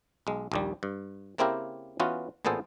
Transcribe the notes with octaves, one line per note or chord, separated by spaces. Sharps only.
B1 G#3
A#1 D#2 G3
G2
C#3 A#3 C4 E4 G4 A#4
E3 B3 C#4 F4 F#4
A1 A#2 B3 G#4 A4 C5